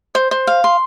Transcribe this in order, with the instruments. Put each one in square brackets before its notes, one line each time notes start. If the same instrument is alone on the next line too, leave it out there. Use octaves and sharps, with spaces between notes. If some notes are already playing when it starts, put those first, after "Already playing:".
[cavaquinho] C5
C5
F5
C6